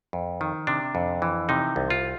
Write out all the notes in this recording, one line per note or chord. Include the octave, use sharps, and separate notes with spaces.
F2
D#3
C3 D4
F2
E3
C3 D#4
C2
F4